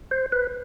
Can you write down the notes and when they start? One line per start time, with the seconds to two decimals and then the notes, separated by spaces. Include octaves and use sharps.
0.11 C5
0.32 B4